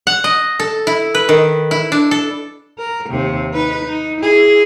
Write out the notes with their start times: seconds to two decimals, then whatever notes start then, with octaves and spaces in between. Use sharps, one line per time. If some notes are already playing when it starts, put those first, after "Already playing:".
0.07 F#5
0.24 D#5
0.59 A4
0.87 E4
1.15 B4
1.29 D#3
1.71 E4
1.92 D4
2.11 A4
2.78 A#4
3.10 D#2 C3
3.53 D#4 B4
3.84 D#4
4.21 E4 G#4